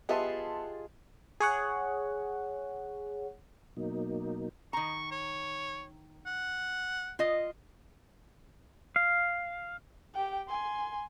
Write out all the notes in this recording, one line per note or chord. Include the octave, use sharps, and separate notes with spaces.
B3 F4 G4 G#4 D#5 E5 A5 C6
G#4 C#5 F#5
B2 F#3 A#3 D#4
D#3 A#5 C#6
C#5
F#5
F4 D#5
F5
G4 G5
G#5 C6